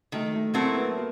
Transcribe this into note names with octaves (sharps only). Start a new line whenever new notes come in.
D#3 A3
A3
F#3 A3 A#3 C4 E4
B3
A#3